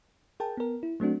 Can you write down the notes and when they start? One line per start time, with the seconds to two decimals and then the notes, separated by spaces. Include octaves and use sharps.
0.40 G#4 A#4 G5 A5
0.57 B3 A#4
0.83 E4
1.00 F#3 A3 C4 D4 F#4